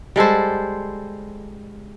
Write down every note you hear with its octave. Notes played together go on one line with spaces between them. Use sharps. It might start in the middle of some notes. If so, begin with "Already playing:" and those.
G3 G#3 A4 C5